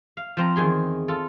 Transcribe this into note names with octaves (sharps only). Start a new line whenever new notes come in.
F5
F3 C4 A#5
E2 D#3 G#4 C6
F4 A4